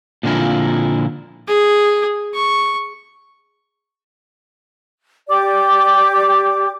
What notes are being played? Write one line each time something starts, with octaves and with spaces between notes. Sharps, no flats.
A#2 D3 F3 A#3 E4
G#4
C#6
G4 D5 D6